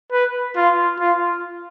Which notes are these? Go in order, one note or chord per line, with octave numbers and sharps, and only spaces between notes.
B4
F4
F4